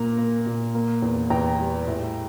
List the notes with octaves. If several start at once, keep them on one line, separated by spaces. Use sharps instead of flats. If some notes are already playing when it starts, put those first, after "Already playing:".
Already playing: A#2 A#3 A#5
A#3
A#2
A#3
E2
E2 G5 A#5
G3
A2